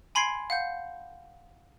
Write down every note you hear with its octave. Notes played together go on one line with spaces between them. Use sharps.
G#5 B5 C6 G#6 C7 D7
F5 F#5 G6